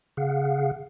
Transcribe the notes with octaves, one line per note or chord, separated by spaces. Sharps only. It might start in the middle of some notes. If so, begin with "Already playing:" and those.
C#3 G#4 F5 F#5